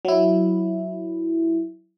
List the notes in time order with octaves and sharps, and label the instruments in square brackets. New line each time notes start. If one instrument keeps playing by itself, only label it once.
[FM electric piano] F#3 E4